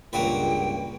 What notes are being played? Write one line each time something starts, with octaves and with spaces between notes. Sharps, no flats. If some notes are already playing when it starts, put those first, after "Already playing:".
C#2 G2 A#2 A#3 F#4 B4 G5